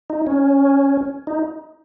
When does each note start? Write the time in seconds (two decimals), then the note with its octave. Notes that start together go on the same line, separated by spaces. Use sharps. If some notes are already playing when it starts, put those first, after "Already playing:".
0.10 D#4
0.27 C#4
1.27 D#4